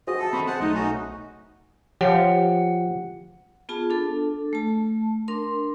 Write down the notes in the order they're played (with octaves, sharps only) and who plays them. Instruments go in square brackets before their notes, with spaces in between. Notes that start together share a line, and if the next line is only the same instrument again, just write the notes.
[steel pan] F#4 G#4 C5 [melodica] D#5
[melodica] A4 [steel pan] E5 A5
[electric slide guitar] C4 C5 D#5 [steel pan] B5 C#6
[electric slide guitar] G#4 [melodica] C5 F#5 A5
[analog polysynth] B1 D#4 [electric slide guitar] A3 [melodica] D#5
[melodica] C#4 F#4
[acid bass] F3 [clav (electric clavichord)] G4 [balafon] C#5 [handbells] F#5
[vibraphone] B3 F4 G#4 A5
D4 A4
A3 A5
D4 A#4 C6